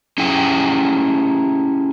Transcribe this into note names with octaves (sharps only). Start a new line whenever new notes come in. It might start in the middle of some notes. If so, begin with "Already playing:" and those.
C#4 E4 G4 G#4 G5